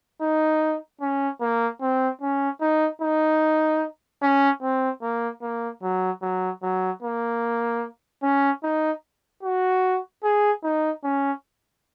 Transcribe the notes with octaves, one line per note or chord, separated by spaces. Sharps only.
D#4
C#4
A#3
C4
C#4
D#4
D#4
C#4
C4
A#3
A#3
F#3
F#3
F#3
A#3
C#4
D#4
F#4
G#4
D#4
C#4